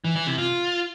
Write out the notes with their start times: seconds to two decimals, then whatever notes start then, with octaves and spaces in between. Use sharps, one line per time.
0.04 E3
0.16 E3
0.27 C3
0.38 F4